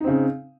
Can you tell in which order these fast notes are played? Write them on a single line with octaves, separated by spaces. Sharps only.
D#4 C4 C#3